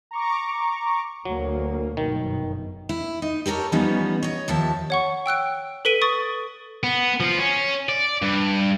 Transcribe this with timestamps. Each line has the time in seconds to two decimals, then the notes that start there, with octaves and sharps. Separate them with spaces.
0.11 A#5 C#6 D6
1.25 D2 F#3 A#3
1.97 G1 F#2 B2 D#3
2.89 E4
3.22 D#4
3.46 G4 A4 A#4 C#5
3.72 E3 F3 G3 B3 C#4 D#4
4.23 C#5 D#5
4.48 D#2 F3 E5 A5
4.90 C#5 F#5 C#6
5.26 G5 E6 F#6 D7
5.85 A4 B4 B6 D7 D#7
6.02 C#6 D#6 A6
6.83 B3
7.20 F3 F4
7.38 C#4
7.89 D5
8.22 G2